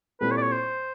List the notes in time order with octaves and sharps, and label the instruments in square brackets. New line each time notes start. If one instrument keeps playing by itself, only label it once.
[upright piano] A#2 G3 C4 E4 A4 [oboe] B4
[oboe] C#5
D5
C#5
C5